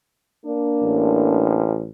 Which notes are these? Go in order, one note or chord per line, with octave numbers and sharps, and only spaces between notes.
A#3 D4
A1